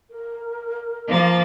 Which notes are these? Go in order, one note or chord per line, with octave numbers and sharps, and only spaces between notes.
A#4
F3 A#3 A6